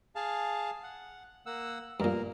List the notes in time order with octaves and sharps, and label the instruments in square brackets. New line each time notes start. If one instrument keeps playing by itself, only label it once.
[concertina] G#4 F5 A5
F#5
A#3 F#5 E6
[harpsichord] G2 A#2 [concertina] A#3 A#4